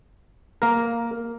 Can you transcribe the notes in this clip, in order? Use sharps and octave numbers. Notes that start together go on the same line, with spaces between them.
A#3 A#4